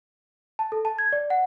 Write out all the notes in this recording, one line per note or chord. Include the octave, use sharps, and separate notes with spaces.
A5
A4
A5
G#6
D5
F#5